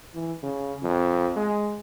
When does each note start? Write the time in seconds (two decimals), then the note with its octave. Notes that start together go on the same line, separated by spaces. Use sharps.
0.15 E3
0.43 C#3
0.83 F2
1.36 G#3